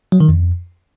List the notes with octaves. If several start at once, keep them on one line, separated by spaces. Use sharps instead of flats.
F#3
D#3
F2